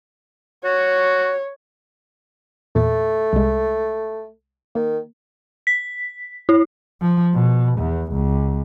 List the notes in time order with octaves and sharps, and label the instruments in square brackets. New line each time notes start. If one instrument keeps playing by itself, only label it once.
[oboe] F#4 [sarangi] C#5
[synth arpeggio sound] E2 A#2 A6 [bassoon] A3
[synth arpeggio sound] C2 G#3
[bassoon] D#3 [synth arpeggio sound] A#3
[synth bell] B6
E4
[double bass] F3
B2
E2
C#2